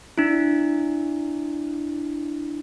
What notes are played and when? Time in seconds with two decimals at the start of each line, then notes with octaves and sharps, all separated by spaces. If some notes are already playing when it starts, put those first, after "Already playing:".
0.18 D4 E4